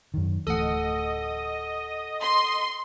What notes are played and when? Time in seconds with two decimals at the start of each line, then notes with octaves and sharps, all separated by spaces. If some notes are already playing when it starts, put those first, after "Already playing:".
0.14 F#2 D#3
0.47 D1 E3 A3 A4 D#5 F#5
2.21 C6